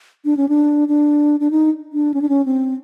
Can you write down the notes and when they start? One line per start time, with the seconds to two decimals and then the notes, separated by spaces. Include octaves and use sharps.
0.25 D4
0.37 C#4
0.49 D4
0.88 D4
1.40 D4
1.51 D#4
1.93 D4
2.14 C#4
2.22 D4
2.29 C#4
2.46 C4